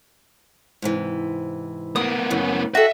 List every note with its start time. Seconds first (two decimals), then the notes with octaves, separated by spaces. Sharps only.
0.82 G#2 C3 E3
1.96 A#3 B3 D#6
2.31 F#2 C#3 E3
2.75 F#4 A4 D#5 E5